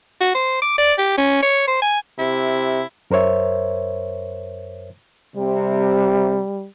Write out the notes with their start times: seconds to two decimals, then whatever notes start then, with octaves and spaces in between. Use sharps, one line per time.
0.21 F#4
0.35 C5
0.62 D6
0.78 D5
0.98 G4
1.18 C#4
1.43 C#5
1.67 C5
1.82 G#5
2.19 C3 E4
3.11 F#2 A#4 C5 C#5 E5
5.37 C3 G3